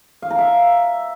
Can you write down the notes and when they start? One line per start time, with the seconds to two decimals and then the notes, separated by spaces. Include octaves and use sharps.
0.22 F5
0.30 A#5
0.39 E5